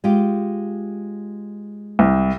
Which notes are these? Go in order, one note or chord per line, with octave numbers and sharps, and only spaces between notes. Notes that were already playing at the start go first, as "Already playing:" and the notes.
G#3 F4 G4
C2